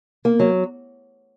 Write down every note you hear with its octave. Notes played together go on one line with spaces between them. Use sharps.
A#3
F#3